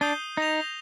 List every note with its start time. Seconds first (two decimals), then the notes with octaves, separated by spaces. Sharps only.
0.01 D4 D#6 G6 C7 D#7 G7
0.37 D#4 D#6 A#6 F7